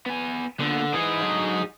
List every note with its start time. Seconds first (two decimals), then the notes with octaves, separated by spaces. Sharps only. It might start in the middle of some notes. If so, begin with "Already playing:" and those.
0.06 B3 G#5
0.59 A#2 D3 B3
0.93 E3 D#4 G#4
1.22 D3 F#3